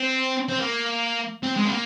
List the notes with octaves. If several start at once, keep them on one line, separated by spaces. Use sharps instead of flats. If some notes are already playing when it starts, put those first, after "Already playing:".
Already playing: C4
C4
A#3
C4
G#3
C4
A#3